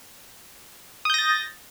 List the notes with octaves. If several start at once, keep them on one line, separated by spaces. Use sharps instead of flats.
D#6 G6 A6 A#6